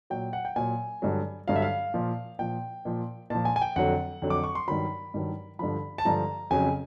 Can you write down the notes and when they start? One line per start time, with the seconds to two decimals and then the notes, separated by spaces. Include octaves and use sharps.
0.10 A#2 F#3 G5
0.33 F#5
0.45 G5
0.56 A#2 F#3 G#5
1.02 G2 D3 F#3
1.48 G2 D3 F#3 F5
1.56 E5
1.62 F5
1.94 A#2 F3
2.39 A#2 F3 G5
2.85 A#2 F3
3.30 A#2 F3 A5
3.45 G#5
3.56 G#5
3.61 G5
3.76 F2 D3 F#3 F#5
4.22 F2 D3 F#3
4.30 D6
4.44 C#6
4.55 C6
4.68 G2 D#3 F#3 B5
5.14 G2 D#3 F#3
5.59 G2 D3 F3 B5
5.98 A5
6.05 G2 D3 F3 A#5
6.51 F2 C#3 F#3 G#5